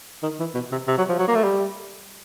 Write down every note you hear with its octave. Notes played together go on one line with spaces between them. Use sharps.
D#3
E3
B2
C3
C3
F#3
F3
F#3
A#3
A3
G3